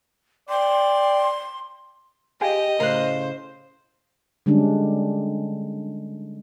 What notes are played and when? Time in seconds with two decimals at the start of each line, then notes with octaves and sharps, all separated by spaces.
0.49 D5 G5 C6
2.41 F4 G4 G#4 D#5 G5
2.80 A2 C#3 A#4 C5 F5 F#6
4.46 D3 G3 G#3 C#4 D4